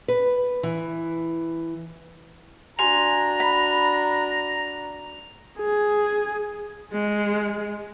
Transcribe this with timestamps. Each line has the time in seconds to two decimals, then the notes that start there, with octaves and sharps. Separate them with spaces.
0.08 B4
0.63 E3
2.79 D4 F#4 G#5 A#5 C6 F7
3.40 B5
5.60 G#4
6.93 G#3